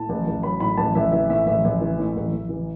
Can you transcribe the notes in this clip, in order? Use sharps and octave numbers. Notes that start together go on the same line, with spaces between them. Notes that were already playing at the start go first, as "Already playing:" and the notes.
Already playing: A2 A5
A1
A1
F#3 B5
A2 B5
A1 A5
A1 E5
E3 E5
A2 E5
A1 E5
A1
E3
A2
A1
A1
E3